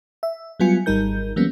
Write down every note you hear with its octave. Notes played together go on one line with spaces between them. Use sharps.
E5
F#3 G3 B3 F4 G#5 C#7
G#1 G3 D#4 A#4 G6
E3 F#3 G3 A#3 B3 C#4